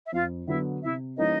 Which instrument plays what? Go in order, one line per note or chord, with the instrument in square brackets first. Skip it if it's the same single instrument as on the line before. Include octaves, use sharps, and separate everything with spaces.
[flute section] E5
[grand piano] F2 [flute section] F4 F5
[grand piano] D3 F#3 B3 [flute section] E4 E5
[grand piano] C3 [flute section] E4 E5
[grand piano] E3 G3 A#3 C#4 [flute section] D#4 D#5